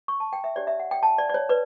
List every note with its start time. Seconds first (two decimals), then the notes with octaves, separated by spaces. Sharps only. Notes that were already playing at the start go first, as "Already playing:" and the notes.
0.08 C#6
0.20 A5
0.33 G5
0.44 E5
0.56 D4 G4 C#5 D5
0.67 E5
0.80 F#5
0.91 G5
1.03 A5
1.18 D5
1.29 D5
1.34 C#5
1.49 B4 D5